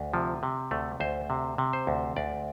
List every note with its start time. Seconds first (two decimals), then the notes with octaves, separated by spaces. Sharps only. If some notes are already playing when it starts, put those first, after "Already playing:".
Already playing: D2
0.14 C3 F3
0.43 C3
0.71 D2 A3
1.00 D2 C5
1.30 C3
1.58 C3
1.73 C5
1.87 D2
2.16 D2 D5